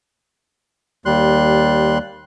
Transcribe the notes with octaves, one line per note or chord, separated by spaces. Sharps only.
D#2 G3 C6 F#6